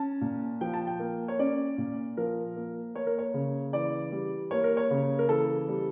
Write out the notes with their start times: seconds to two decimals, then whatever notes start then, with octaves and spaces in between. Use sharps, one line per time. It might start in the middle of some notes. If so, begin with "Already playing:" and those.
Already playing: C#4 A5
0.21 A#2
0.61 F3 G5
0.74 A5
0.87 G5
1.00 A#3
1.28 C#5
1.39 C#4 D5
1.78 A#2
2.17 F3 A#4
2.56 A#3
2.95 A#3 C#5
3.07 A#4
3.19 C#5
3.34 C#3
3.73 E3 D5
4.12 G3
4.51 A#3 C#5
4.64 A#4
4.77 C#5
4.91 C#3
5.19 A#4
5.29 E3 A4
5.68 G3